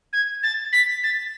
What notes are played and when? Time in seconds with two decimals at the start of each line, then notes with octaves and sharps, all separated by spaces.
0.13 G#6
0.43 A6
0.72 B6
1.03 A6